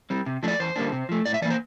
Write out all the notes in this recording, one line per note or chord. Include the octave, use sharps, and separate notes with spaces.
G3 C4
C3
F3 A3 D4
D5
E2 C5
D3 G3 A#3 D4
C3
F3 A3
A2 D5
E5
E3 A#3 C5 D5